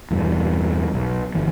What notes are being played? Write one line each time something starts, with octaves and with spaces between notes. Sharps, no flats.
E2 G2 B2
B1
G1 E3